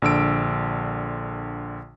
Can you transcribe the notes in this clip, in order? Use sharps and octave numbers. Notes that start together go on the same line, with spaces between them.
A#1 D3 E6 D7